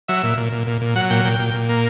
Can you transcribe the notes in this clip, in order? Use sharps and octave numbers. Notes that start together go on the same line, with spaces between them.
F#3 E5
A#2
A#2
A#2
A#2
A#2
F#3 F#5
A#2 G5
A#2 G5
A#2
A#2
A#3